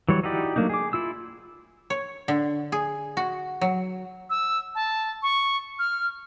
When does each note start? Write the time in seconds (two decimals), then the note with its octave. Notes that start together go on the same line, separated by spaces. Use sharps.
0.09 E3 F#3 G3 C#5
0.23 D#4 E4 F#4 G4 D5
0.56 F#3 A3 A#3 D4 D#4
0.69 G#4 D6
0.93 E4 F4 E6
1.90 C#5
2.28 D3
2.72 G#4
3.17 F#4
3.61 F#3
4.30 E6
4.75 A5
5.23 C#6
5.79 F6